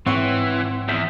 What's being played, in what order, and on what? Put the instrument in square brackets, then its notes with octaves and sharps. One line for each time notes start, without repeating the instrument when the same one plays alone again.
[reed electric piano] G#2 [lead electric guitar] E3 [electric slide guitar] C4 [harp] C#5 F#5 C#6
[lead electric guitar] E2 [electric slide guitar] G#4 C5 E5